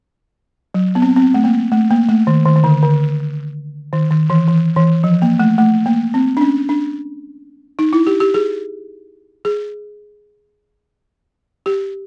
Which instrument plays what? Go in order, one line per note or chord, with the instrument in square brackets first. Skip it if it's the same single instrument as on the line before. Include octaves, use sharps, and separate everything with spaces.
[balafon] F#3
B3
C4
C4
A3
A#3
A3
A#3
A3
D#3
D#3
D#3
D3
D3
D#3
D#3
E3
E3
E3
F3
A#3
A3
A3
A#3
C4
D4
C#4
D4
D#4
E4
G4
G4
G#4
G#4
G4